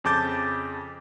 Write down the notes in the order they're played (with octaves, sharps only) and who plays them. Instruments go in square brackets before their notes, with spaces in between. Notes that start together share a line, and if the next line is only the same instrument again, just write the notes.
[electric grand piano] F2 C#3 A5 D6 G6 A6